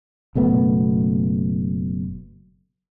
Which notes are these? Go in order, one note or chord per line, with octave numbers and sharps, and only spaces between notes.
F#1 B2 A3 B3